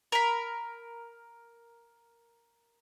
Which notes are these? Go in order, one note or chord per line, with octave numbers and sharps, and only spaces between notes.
A#4 B5